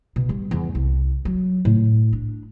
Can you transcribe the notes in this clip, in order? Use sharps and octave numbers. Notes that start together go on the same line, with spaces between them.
B2
G3
E2
C2
F#3
A2
D4